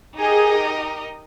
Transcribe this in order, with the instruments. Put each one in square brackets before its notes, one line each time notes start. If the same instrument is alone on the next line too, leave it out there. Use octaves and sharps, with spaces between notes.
[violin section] D#4 G4 A#4 D#5 [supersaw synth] G#4